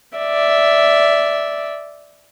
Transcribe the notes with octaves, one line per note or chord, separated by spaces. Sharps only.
D5 E5